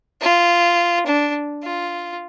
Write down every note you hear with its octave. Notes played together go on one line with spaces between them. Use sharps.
F4
D4
F4